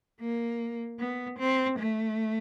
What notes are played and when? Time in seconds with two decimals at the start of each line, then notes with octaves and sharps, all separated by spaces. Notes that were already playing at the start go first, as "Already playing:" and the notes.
0.20 A#3
1.00 B3
1.39 C4
1.79 A3